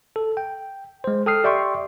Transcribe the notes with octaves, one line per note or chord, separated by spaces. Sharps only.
A4
G5
G#3 C5
A4 G5 D#6 F6 C7
G4 D5 E5 G5 C6 C#6